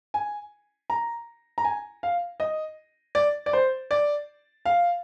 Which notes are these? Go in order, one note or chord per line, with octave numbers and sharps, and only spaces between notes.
G#5
A#5
A#5
G#5
F5
D#5
D5
D5
C5
D5
F5